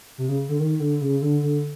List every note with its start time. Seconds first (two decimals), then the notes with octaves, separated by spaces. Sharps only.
0.18 C3
0.29 C#3
0.49 D3
0.60 D#3
0.80 D3
1.01 C#3
1.22 D3
1.43 D3